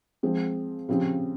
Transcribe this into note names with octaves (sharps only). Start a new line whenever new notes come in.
F3 G#3 C4
C#3 F3 C4 G4